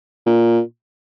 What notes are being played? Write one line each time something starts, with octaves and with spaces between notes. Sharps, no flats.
A#2